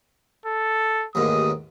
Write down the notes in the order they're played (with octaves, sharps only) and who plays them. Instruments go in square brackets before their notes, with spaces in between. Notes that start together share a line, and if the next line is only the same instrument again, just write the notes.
[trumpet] A4
[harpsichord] A1 D#2 G#2 [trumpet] D#6